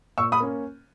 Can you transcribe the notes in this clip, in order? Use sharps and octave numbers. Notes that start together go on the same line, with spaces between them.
A#2 C#6 E6
B5 D#6
A#3 C#4